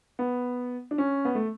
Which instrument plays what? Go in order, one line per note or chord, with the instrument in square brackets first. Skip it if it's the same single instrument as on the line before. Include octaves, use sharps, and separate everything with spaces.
[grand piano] B3
D4
C#4
B3
A3